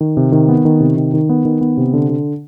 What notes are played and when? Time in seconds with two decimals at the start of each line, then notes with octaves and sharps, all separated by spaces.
0.01 D#3
0.17 C3
0.32 D#3
0.49 B3
0.65 D#3
0.80 C3
0.97 D#3
1.14 D#3
1.29 B3
1.45 D#3
1.61 B3
1.77 C3
1.94 D3
2.09 D3